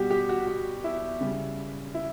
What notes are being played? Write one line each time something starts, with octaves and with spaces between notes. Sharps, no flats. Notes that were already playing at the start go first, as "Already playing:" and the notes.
Already playing: B2 G3 F#4 G4
G4
F#4
F#4
E4
C#3 G3
E4